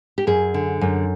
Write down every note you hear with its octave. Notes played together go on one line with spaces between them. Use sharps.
G4
F#2 G#4
D3
F#2